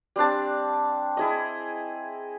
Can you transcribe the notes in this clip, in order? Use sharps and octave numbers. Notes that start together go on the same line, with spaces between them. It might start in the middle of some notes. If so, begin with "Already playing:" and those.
G3 C4 D4 A5
E4 G#4 D#5